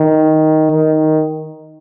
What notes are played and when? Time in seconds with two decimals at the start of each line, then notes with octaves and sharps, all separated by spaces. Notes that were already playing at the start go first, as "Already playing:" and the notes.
Already playing: D#3
0.72 D#3